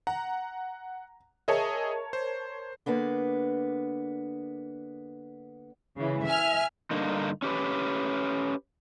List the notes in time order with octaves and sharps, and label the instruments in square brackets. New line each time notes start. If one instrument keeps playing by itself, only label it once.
[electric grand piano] F#5 [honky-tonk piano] A#5
[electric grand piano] G#4 D#5 E5 [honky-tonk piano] A#4 C#5 A5
[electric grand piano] C5
[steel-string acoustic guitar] D3 A#3 B3 D4
[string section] C#3 E3
E5 G#5 F6
[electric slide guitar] G2 D3 A#3 D#4
C#4 G4 B4